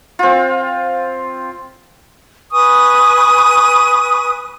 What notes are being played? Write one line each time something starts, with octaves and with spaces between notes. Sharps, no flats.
C4 F4
B4 G#5 C#6 D#6